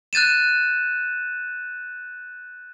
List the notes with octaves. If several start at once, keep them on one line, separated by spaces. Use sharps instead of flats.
F#6 G6 A6 D#7 E7